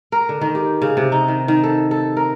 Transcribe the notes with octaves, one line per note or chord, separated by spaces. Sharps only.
A#4
D3
D#3
G4
C#3
C3
D#4
D#3
D#3
A4
A4
A#4